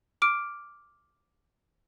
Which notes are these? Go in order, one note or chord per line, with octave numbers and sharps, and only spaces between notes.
D6 F6 D7